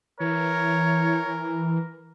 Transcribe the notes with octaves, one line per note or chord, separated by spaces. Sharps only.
E3 A#4 C#5